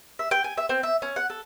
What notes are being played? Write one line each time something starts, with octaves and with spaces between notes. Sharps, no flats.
E5
G5
G#5
E5
C4
E5
C#4
F#5
A4